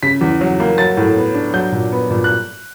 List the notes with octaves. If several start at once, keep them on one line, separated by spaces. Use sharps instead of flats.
C#3 B6
E2
F#3
A#3
F#3 A6
A2
B3
D4
F#3 G6
A#2
B3
A#2
F#6